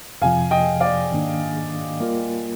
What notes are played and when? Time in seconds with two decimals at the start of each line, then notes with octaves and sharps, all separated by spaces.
0.21 F2 C3 F3 F5 G#5
0.51 D#5 G5
0.80 D5 F5
1.11 G#2 D#3 A#3 D4
1.99 G3 A#3 F4 A#4